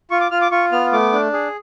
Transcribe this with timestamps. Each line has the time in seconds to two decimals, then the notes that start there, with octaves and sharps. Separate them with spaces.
0.11 F4 C#6
0.21 D6
0.31 F4 F6
0.41 D6
0.51 F4 C#6
0.72 B3 F6
0.92 A3 D6
1.13 D4
1.33 G#4